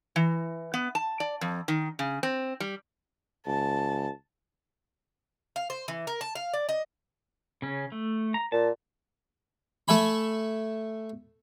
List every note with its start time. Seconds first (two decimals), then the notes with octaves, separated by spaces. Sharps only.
0.16 E3
0.74 B3
0.95 A5
1.20 D5
1.41 F2
1.68 D#3
1.99 C#3
2.23 C4
2.60 G3
3.46 C#2 A5
5.56 F5
5.70 C5
5.88 E3
6.07 A#4
6.21 A5
6.35 F5
6.53 D5
6.69 D#5
7.62 C#3 C#4
7.92 A3
8.34 A#5
8.52 A#2 A5
9.88 A3 A4 E5 G#5 B5